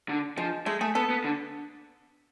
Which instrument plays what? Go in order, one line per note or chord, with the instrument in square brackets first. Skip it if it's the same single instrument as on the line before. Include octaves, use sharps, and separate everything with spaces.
[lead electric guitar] D3
[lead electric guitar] F3 [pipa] G#3
[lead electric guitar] G#3 [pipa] A3
[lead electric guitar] A3 [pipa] G#4
[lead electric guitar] B3 [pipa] A4
[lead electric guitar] B3
D3